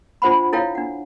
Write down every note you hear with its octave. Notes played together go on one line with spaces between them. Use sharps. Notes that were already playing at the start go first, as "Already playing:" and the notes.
D4 F4 C5 F#5 B5
E4 A4 C#5 F5 G5
D4 F#5